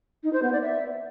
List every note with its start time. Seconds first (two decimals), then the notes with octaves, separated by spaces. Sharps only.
0.23 D#4
0.33 C5
0.43 B3
0.52 D5
0.62 E5